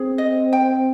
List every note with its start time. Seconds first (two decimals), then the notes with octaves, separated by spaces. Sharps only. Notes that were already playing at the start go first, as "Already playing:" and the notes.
Already playing: C4 G#4
0.18 D#5
0.53 G5